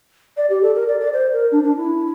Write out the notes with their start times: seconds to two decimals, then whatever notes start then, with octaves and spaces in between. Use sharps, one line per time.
0.37 D5
0.50 G4
0.62 A4
0.75 A#4
0.88 D5
1.00 D5
1.13 C5
1.32 A#4
1.52 D4
1.64 D4
1.77 E4